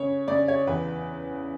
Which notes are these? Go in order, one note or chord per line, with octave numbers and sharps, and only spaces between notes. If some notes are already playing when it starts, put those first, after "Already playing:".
Already playing: C#3 C#5
C#3 D5
C#5
E2 B4